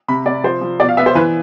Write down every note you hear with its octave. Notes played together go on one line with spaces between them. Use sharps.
C3 B5
C3 D5
F3 C5
F3
B2 D5
F5
B3 E5
C5
E3 B4